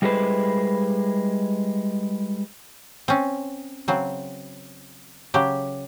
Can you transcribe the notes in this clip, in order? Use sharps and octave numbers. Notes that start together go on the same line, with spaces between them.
G3 G#3 E4 A4 B4 C5
C4 C#4
C#3 F#3 C4
C#3 F#3 G4